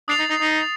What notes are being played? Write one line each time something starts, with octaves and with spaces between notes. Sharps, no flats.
D4 D#6 A6 C7 F7
D#4
D#4
D#4